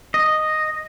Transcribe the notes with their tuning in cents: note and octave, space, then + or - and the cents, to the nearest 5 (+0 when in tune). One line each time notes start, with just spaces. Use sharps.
D#5 -5